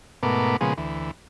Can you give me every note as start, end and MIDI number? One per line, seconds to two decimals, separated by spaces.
0.23 0.57 44
0.23 0.57 47
0.23 0.57 57
0.23 0.57 59
0.23 0.57 70
0.23 0.57 86
0.61 0.74 46
0.61 0.74 49
0.61 0.74 53
0.61 0.74 56
0.61 0.74 59
0.61 0.74 68
0.78 1.11 38
0.78 1.11 52